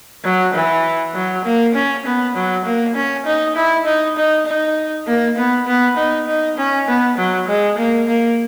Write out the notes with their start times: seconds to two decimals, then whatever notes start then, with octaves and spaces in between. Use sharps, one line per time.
0.24 F#3
0.54 E3
1.14 F#3
1.45 A#3
1.75 C#4
2.05 B3
2.35 F#3
2.65 A#3
2.95 C#4
3.26 D#4
3.56 E4
3.86 D#4
4.17 D#4
4.46 D#4
5.07 A#3
5.37 B3
5.67 B3
5.97 D#4
6.27 D#4
6.57 C#4
6.88 B3
7.18 F#3
7.48 G#3
7.78 A#3
8.08 A#3